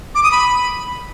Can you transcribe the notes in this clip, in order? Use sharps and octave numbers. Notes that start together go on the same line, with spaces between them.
D6
D#6
B5